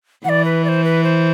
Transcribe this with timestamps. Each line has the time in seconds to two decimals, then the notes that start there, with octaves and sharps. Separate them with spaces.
0.24 E3 D5 F#5
0.45 B4
0.64 D5
0.68 C5
0.84 B4
1.04 C5